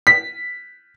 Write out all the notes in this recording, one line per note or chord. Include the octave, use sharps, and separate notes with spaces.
B6